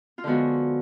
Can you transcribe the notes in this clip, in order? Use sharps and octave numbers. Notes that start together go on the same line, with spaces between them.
F4
D3 F3 G#3 B3 F#4